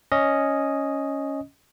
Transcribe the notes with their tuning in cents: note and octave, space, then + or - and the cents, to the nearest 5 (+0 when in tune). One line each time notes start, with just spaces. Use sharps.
C#4 +0 D#5 +0 D#6 +0